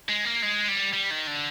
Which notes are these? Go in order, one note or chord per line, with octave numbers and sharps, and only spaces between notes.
G#3
A#3
G#3
G3
G3
D#3
D3